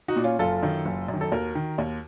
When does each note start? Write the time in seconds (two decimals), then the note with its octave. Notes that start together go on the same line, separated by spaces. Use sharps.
0.08 D#4 F#4
0.16 A#2
0.24 C#4 F4
0.39 F#1 F4 A4
0.63 F#2 D#3
0.85 F#1
1.08 F#2
1.14 D#3
1.21 A4
1.32 D#2 F#4 A#4
1.55 D#3
1.78 D#2